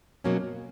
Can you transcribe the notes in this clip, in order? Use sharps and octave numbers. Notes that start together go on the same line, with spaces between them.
B2 F#3 A#3 C#4